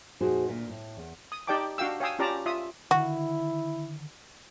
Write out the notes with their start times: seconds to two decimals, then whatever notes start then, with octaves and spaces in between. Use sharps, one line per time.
0.21 F2 A#2 D#4 F#4 G#4 C5
0.48 D2 A#2
0.69 A2
0.97 E2
1.32 D#6
1.47 D#4 G4 D5 G5 A5 D6
1.78 D4 F#4 F5 G5 E6
2.00 C#5 F5 G5 G#5 D#6 E6
2.19 C#4 F4 G4 D5 A5 A#5
2.46 F4 E5 D#6
2.91 D3 D#3 E4 F#4